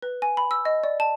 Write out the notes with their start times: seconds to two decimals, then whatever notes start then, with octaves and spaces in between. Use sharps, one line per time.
0.02 B4
0.22 G#5
0.37 B5
0.51 E6
0.65 D#5
0.84 D5
1.00 A5